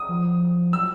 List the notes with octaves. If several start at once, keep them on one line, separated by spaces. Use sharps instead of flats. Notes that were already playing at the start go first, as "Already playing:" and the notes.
Already playing: D#6
F3
F#3 E6